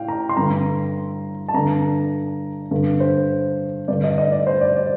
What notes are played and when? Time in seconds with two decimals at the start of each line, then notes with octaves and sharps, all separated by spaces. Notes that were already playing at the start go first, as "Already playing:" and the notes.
Already playing: A2 F5 G5
0.08 A#5
0.29 C6
0.37 G2 D3 A#5
1.48 A5
1.54 G2 D3 A#5
2.71 G2 D3
3.00 C5
3.88 G2 D3 D5
4.04 D#5
4.18 D#5
4.32 D5
4.47 C5
4.61 D5
4.76 D5